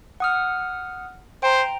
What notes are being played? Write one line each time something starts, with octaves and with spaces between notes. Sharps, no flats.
F#5 D#6 F6
C5 G5 A#5